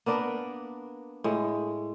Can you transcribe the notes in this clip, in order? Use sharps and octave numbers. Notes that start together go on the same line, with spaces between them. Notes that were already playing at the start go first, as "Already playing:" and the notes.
A#3 B3 D4 A#4
A2 G#3